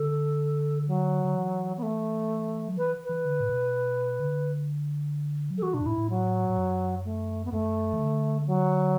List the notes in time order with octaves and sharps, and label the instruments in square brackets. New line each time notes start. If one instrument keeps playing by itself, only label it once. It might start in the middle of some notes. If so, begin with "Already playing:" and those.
Already playing: [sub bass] D3 [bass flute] A4
[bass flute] F#3
[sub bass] D3
E3
[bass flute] B3
A3
[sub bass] F#3
[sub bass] E3 [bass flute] B4
[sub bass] E3 [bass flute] B4
[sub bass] D3
A2
B2
D3
F#3
[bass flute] A4
[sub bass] E3 [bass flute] F#4
[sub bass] B2 [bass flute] D4
[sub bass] F#2
[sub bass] A2 [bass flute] E4
[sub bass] A2
[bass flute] F#3
[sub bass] A2
F#2
[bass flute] A3
B3
[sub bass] F#2 [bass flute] A3
[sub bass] E3
D3
[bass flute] F#3